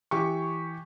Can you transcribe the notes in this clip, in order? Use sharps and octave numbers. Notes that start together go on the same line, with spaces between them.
E3 G4 C#6